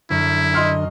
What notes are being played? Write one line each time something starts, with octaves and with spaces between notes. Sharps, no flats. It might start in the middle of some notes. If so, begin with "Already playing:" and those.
F#2 D3 E4
D#5 C6 F6